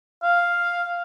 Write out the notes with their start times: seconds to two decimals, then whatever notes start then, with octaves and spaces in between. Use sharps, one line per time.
0.23 F5